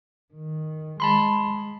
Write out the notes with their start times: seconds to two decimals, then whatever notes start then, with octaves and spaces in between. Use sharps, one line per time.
0.34 D#3
1.00 G#3 A5 B5 C6